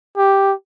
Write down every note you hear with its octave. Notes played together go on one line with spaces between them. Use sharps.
G4